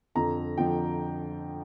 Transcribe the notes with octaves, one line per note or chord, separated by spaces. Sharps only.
F2 D3 F3 A#5
F2 D3 F3 G5